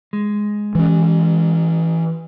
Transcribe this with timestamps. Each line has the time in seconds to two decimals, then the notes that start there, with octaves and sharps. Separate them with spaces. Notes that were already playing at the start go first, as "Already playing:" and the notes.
0.13 G#3
0.75 E3 C#4